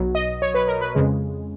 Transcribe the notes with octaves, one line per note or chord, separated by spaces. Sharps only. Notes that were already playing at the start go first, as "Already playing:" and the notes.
Already playing: B1 B2 F#3
D#5
C#5
B4
A#4
B4
F2 C#3 G#3